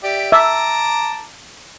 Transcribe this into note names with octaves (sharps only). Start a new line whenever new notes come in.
G4 D5 E5
E5 A5 A#5 D6